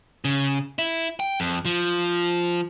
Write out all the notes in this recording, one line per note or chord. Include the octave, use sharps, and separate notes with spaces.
C#3
E4
G5
F2
F3